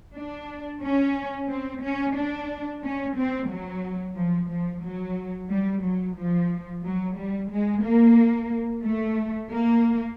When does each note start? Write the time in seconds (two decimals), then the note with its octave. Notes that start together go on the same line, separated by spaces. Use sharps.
0.15 D4
0.82 C#4
1.49 C4
1.83 C#4
2.15 D4
2.82 C#4
3.16 C4
3.49 F#3
4.16 F3
4.49 F3
4.83 F#3
5.50 G3
5.83 F#3
6.16 F3
6.84 F#3
7.17 G3
7.50 G#3
7.83 A#3
8.84 A3
9.50 A#3